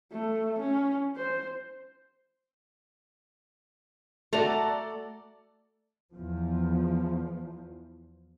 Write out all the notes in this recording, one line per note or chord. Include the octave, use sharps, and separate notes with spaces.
A3
C#4
C5
A3 F#4 A4 D5 A#5
E2 F3